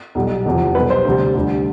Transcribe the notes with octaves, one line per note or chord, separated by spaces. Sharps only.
B1 B2 G3
F1 E2 C3 F3
B1 B2 G3 B4
C5
D2 C3 G3
D2 D3 G3